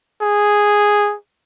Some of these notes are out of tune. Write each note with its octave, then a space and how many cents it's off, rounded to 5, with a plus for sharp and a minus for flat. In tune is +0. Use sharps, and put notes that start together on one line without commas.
G#4 -5